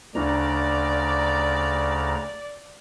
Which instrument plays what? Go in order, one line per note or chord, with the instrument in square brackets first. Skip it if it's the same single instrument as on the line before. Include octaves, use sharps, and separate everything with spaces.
[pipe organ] D2 C#3 A#5 [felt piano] D4 [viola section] D5